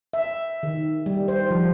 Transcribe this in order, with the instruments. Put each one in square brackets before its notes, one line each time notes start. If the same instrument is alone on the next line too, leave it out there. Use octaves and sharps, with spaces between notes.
[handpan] E5
D#3
G3
C5
F3